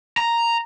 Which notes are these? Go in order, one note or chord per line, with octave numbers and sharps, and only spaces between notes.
A#5